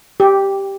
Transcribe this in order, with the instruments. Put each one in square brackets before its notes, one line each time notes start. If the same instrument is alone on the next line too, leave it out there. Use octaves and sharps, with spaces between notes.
[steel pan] G4